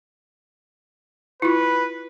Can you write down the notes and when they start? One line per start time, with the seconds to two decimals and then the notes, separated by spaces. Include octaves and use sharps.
1.42 E4 F4 B4